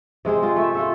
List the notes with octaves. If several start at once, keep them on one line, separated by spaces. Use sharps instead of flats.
C3 G#3 G#4 C5
G#3 F4
A3 E5
F4 A4 E5